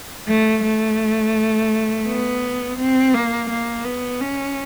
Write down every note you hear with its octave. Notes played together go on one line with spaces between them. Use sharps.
A3
A3
B3
C4
A#3
A#3
B3
C#4